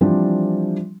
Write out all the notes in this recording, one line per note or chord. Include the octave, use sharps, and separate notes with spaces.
E3 F3 G3 C4 D4